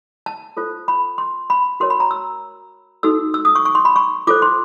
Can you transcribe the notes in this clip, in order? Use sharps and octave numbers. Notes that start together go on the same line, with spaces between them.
A5
F4 A4 C5
B5
C6
B5
F#4 A#4 C#5 C6
B5
A#5
E6
D#4 F#4 A4 E6
E6
D#6
C#6
C#6
C6
B5
C#6
F4 A4 C5 D6
C6